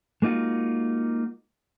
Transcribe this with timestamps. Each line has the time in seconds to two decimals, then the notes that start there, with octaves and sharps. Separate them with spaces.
0.22 G#3 A#3 D#4 F4 F#4